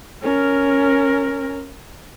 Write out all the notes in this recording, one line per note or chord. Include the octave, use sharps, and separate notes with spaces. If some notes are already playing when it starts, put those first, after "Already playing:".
C#4 A#4